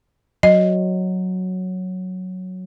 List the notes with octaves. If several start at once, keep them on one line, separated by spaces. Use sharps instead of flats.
F#3 D#5